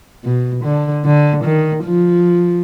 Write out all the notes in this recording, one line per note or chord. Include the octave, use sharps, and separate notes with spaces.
B2
D3
D3
D#3
F3